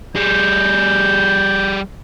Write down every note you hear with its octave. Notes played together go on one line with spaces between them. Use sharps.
G3 G#4 G6